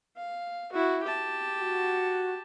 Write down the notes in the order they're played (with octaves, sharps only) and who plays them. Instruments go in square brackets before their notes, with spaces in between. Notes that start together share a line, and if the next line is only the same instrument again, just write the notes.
[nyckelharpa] F5
E4 F#4
G4 A5
[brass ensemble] F#4